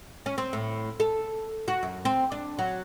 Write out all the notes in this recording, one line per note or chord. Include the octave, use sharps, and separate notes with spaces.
C#4
C4
A2
A4
F#4
F#2
C4
D4
F#3